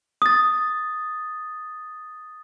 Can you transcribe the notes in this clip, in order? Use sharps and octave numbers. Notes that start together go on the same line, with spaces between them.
D#6 A6